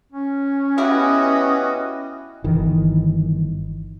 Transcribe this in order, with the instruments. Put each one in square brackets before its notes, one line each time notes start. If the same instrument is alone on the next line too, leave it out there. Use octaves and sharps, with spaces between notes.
[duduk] C#4
[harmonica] B3 F#4 B4 [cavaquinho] E4 G4 G#5 [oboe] D#5
[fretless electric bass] G1 D#3 E3